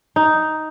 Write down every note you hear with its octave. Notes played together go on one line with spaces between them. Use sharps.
D#4